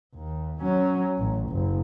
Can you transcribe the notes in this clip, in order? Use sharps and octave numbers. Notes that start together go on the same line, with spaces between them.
D#2
F#3 C#4
A1
F#1